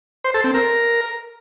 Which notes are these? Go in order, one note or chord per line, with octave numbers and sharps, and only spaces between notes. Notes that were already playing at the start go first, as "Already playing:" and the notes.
C5
A4
C4
A#4